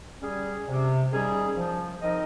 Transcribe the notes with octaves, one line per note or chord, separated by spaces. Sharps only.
G3 C#4 G#4
C3
D#3 G3 C#4 G#4
F3
C4 D#4 A#4 D#5